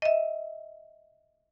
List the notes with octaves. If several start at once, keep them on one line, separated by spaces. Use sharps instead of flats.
D#5 E5